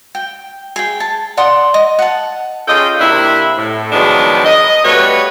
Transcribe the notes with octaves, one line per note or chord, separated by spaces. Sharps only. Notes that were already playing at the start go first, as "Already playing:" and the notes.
G5
G#4 G5
A5
D5 F#5 C6 D#6
D#5
F#5 A5
C#4 F4 G#4 A4 D#5 G5
C3 A#3 C4 D4 E4
A2
D#3 F3 F#3 G#3 B3 D4
D#5
G3 A3 B3 F#4 B4 C#5